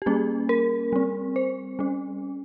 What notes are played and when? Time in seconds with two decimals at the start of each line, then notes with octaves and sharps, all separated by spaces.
0.02 G4
0.06 G3 A#3 C#4 G#4
0.49 A#4
0.93 G3 C4
1.36 C5
1.79 G3 C#4